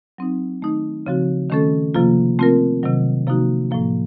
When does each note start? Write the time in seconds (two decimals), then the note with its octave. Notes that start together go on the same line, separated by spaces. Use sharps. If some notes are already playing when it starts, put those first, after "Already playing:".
0.18 F#3 C4 D#4
0.62 D#3 A3 D#4
1.06 C#3 F3 C4 F#4
1.50 D#3 A3 C#4 A4
1.94 C3 F3 A#3 F4
2.39 A3 C4 F4 A#4
2.83 C3 D#3 F#3
3.27 C3 F3 A#3 D#4 F#4
3.71 A2 F3 A#3